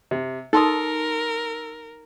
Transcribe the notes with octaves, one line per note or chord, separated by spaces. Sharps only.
C3
D#4 A4 A#4 C6 D#6